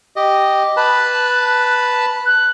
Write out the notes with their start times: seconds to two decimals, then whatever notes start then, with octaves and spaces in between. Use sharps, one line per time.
0.16 G4 D#5
0.77 B4 A5 B5 F#6
2.26 F#6